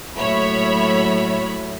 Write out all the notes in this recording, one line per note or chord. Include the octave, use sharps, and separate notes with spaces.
A2 F#3 A#3 C#5 E5 B5